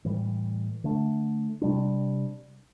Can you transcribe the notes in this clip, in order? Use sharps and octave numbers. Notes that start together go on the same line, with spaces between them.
A2 E3 G3
D3 A3 D4
C3 G3 D4